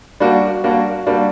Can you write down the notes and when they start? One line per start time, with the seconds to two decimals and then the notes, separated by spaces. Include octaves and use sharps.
0.20 G3 A#3 D4 F#4
0.64 G3 A#3 D4 F#4
1.07 G3 A#3 D4 F#4